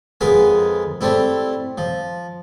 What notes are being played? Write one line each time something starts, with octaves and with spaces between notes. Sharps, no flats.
F2 G#3 B3 G#4 A#4 B5
G3 A3 C4 E4
F3